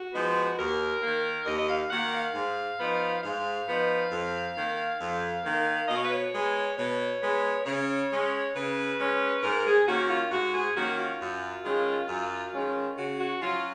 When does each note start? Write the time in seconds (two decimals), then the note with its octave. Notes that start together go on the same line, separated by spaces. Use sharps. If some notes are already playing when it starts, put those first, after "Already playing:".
Already playing: F#4
0.13 F3 G#3 B3 D#4
0.57 D#2 A#4
1.02 D#3 A#3
1.46 D#2 D#5
1.59 D#5
1.68 F5
1.90 D#3 A#3 F#5
2.12 F5
2.35 G#2
2.79 F3 B3 D#4
3.23 G#2 F5
3.67 F3 B3 D#4
4.11 F2
4.56 D#3 A#3
5.00 F2
5.44 D#3 A#3
5.88 B2 D#5
5.96 C#5
6.04 B4
6.11 C#5
6.33 G#3 B3
6.77 B2 C#5
7.22 G#3 B3
7.65 C#3 C#5
8.10 G#3 C#4
8.54 C#3 B4
8.98 G#3 C#4
9.42 G#2 A#4
9.64 G#4
9.87 D#3 A#3 C#4 F#4
10.09 F4
10.31 G#2 F#4
10.53 G#4
10.75 D#3 A#3 C#4 F#4
10.98 F4
11.20 F#2
11.64 D#3 G#3 C#4
12.08 F#2
12.53 D#3 G#3 C#4
12.96 C#3 F#4
13.19 F#4
13.41 F#3 C#4 F4